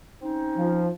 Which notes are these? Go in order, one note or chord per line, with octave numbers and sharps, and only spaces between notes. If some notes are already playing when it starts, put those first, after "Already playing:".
C4 C#4 D#4
F3